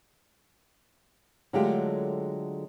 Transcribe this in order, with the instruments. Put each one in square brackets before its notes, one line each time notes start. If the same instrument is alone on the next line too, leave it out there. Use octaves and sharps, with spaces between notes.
[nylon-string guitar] D3 F#3 G#3 A3 F4 G4